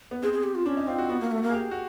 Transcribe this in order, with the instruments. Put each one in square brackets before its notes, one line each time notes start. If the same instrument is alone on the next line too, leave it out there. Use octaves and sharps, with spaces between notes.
[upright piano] B3
[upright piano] C4 [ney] G#4
[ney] G#4
G4
F4
[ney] C#4 [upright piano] D4
[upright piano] D#4
[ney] C4 [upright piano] F4
[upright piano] F#4
[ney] B3 [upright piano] F#4
[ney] A#3
A3
A#3
[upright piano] G#4
G4
F#4